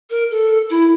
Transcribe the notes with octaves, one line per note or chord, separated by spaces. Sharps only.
A#4
A4
E4